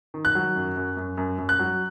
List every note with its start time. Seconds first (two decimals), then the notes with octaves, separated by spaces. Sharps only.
0.14 D#3
0.25 F#6
0.35 F#3
0.56 F#2
0.76 F#2
0.97 F#2
1.18 F#2
1.38 F#2
1.49 F#6
1.59 F#3